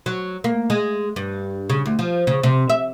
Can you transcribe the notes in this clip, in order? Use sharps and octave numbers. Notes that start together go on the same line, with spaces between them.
F#3
A#3
G#3
G2
C#3
D2
F3
C#3
C3
E5